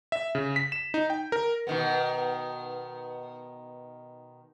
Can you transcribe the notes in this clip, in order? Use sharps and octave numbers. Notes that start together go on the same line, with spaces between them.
E5
C#3
B6
E7
D#4
G5
A#4
B2 D#3 B3